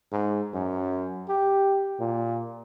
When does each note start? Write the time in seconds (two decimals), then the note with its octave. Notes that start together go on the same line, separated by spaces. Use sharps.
0.12 G#2
0.54 F#2
1.29 G4
2.00 A#2